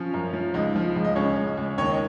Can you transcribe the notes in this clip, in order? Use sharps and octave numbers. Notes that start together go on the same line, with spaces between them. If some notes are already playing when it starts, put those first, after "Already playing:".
Already playing: F3 C#4 C#5
F#2
F3
C#2 D#4 D#5
F3
C#2
D#5
C#2 C#4 C#5
C#2
C#2
D#2 C#5
D#5